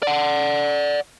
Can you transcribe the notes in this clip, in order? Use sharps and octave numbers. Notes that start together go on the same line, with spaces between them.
D5 F#5